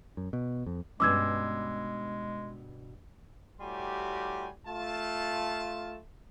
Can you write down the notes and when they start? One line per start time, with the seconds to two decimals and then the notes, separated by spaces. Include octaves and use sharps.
0.17 F#2
0.33 B2
0.66 F2
1.00 G2 B2 G#3 C#4 D6 E6 G#6
3.60 A2 G3 F#4 G4 G#5 C6
4.67 A3 F4 A5